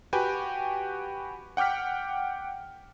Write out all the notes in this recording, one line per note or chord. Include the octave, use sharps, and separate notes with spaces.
F#4 G4 B4 G5 G#5
F#5 G5 D6 F6 B6